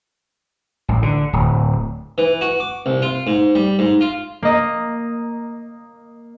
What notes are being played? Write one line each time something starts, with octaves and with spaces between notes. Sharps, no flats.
A1
D3
D1
E3
F#4
D6
C2
F4
G#2
G3
G#2
F4
A#3 D#5